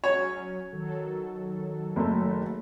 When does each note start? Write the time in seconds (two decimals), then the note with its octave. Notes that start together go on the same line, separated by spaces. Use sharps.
0.04 F#3 C#4 C#5
0.72 D#3 F#3 A4
1.96 F#1 A3